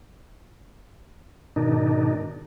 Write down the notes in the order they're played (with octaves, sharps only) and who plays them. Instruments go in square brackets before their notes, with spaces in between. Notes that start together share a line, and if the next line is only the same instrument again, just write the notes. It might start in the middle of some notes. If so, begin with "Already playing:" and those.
[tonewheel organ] G#2 B2 D#3 D4 D#4